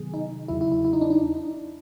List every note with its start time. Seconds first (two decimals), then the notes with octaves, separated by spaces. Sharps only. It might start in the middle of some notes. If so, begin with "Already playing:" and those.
Already playing: C3 D#3 F#3 B3 G#4
0.14 D#4
0.48 E2 C#3 F#3 E4
0.61 E4
0.72 E4
0.85 E4
0.93 D#4
1.01 D4
1.10 D#4